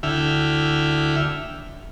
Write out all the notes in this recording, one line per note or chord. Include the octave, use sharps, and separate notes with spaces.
D2 D3 E4 E5 G5 F6